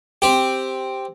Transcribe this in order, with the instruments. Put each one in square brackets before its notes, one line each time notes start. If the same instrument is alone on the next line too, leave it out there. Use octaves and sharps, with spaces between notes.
[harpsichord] C4 G4